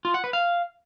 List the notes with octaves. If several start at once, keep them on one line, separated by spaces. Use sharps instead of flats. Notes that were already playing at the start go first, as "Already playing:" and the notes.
F4
F#5
B4
F5